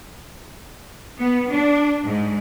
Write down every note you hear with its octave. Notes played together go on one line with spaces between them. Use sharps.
B3
D4
G#2